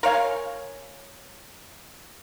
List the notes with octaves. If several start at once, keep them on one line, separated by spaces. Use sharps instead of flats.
A#4 C#5 F5 G#5